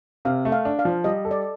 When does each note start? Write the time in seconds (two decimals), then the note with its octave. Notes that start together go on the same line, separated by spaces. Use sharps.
0.25 C3 F5
0.45 A3
0.52 F5
0.65 D4
0.79 F5
0.85 F3
1.04 G3 D#5
1.25 A4
1.31 D5